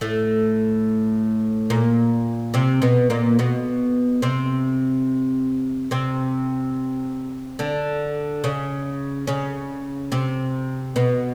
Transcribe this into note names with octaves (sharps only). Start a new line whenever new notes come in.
A2 A3
A#2 A#3
C3 C4
B2 B3
A#2 A#3
B2 B3
C3 C4
C3 C4
D3 D4
C#3 C#4
C#3 C#4
C3 C4
B2 B3